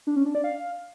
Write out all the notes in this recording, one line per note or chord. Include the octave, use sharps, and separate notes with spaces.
D4
C#4
D4
D5
F5